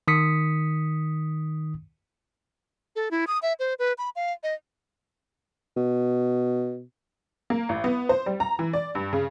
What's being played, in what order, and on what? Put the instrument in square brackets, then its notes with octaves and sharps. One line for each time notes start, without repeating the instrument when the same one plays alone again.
[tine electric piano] D#3 D#6 B6 C#7
[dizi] A4
E4
D#6
E5
C5
B4
B5
F5
D#5
[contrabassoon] B2
[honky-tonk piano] A#3
A1
B3
C5
G3
A#5
E3
D5
G2
C#3